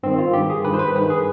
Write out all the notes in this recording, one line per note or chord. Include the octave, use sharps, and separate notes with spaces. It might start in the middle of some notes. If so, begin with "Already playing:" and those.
G2 D#3 C4
F4
G2 D#3 G4
G#4
G2 D#3 B4
C5
B4
G2 D#3 B4
G#4